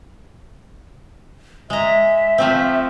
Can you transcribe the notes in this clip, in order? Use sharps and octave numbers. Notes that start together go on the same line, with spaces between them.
G#3 E5 A#5
F3 A3 C4